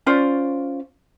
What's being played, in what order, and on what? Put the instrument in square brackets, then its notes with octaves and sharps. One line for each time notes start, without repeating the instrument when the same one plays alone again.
[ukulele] C#4 F4 C5 D5